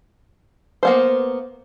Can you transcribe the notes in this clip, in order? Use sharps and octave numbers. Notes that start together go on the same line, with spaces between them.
A#3 B3 C5